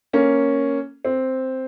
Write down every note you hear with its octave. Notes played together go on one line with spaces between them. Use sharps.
A#3 C#4
C4